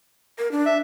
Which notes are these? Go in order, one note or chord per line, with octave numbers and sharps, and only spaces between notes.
A#4
D4
E5